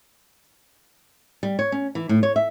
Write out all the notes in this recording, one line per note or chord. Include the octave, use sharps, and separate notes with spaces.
G3
C#5
C#4
E3
A2
C#5
E5